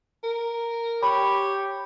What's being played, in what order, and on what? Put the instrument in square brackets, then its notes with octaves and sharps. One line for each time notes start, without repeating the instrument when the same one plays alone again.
[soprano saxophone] A#4
[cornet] G4 [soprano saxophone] C#5 [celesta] B5